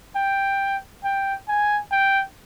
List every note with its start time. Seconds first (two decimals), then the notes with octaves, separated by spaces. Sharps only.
0.16 G5
1.04 G5
1.48 G#5
1.92 G5